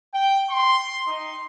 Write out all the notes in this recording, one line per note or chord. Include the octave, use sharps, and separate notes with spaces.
G5
C6
D#4